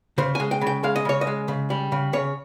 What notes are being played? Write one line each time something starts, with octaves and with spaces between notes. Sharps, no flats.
C#3 C5
G#5
G#3
G5
C#3
G5
G#3 F5
D#5
C#3 C#5
D#5
G#3
C#3
G3
C#3
C#3 C#5